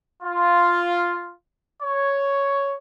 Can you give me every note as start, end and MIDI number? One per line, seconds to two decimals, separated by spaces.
0.22 1.32 65
1.82 2.75 73